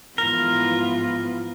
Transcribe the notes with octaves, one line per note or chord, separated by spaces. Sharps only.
G#2 E3 F3 B3 F4 A#4